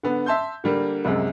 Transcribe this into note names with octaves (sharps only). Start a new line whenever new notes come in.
D3 B3
E5 A5 C6 G6
D3 G3 A#3
C2 F#2 C3 G#3